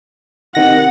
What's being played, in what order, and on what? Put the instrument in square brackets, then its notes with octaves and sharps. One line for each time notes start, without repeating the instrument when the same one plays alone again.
[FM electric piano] C3 D#3 A#6 [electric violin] F#5